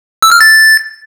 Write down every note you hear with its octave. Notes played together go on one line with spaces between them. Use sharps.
E6
F6
A6